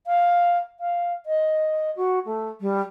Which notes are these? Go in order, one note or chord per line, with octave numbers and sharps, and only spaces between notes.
F5
F5
D#5
F#4
A3
G3